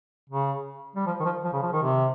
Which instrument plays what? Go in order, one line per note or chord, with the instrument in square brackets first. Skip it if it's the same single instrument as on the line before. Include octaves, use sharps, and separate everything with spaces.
[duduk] C#3
G3
F3
D#3
F3
F3
C#3
F3
D#3
C3